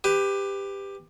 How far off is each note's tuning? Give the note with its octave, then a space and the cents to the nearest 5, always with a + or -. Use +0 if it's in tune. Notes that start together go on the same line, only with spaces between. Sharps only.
G4 +15 B4 +25